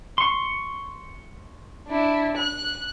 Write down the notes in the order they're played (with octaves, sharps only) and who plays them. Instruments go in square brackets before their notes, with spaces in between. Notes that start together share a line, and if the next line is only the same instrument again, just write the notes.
[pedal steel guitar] C6 C#6
[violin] D4 E4
F#6